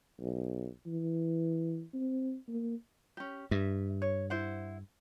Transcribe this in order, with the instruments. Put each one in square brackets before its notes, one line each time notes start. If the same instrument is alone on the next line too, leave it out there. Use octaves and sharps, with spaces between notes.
[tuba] B1
E3
C4
A#3
[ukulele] C#4 G4
[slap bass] G2 [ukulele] E5
[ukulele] C#5
E4 C5 F#5